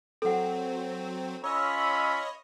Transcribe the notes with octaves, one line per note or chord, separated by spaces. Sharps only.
F#3 C4 A4 F#5
C#4 F4 C#5 D#5 B5 E6